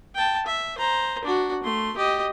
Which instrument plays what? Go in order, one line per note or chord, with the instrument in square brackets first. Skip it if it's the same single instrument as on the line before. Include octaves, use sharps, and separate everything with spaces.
[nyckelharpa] G5 A5
E5
C5 A#5
D4 F#4
A3 C6
G4 D#5